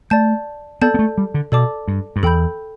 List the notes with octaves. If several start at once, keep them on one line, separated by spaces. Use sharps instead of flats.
A3 D5 A5 G6
B3 A4 D5 A5 G6
B3
A3
G3
D3
B2 A4 D5 A5 D6
G2
G2
E2 A4 G5 B5 G6